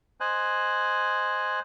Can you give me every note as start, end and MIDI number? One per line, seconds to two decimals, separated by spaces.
0.20 1.60 72
0.20 1.60 75
0.20 1.60 80
0.20 1.60 90